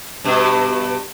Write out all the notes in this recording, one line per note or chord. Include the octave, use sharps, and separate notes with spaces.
G2 B2